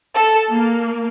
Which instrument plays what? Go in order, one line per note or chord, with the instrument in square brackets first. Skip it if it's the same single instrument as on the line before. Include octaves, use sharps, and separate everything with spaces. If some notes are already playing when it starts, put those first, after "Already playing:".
[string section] A4
A#3